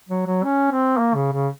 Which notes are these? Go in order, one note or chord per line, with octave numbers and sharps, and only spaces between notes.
F#3
F#3
C#4
C4
A#3
C#3
C#3